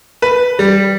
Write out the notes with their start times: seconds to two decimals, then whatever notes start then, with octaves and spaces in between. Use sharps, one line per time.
0.22 B4
0.59 G3